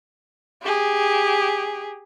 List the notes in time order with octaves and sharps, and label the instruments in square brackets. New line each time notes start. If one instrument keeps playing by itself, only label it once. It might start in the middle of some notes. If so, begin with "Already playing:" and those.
[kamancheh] G4 G#4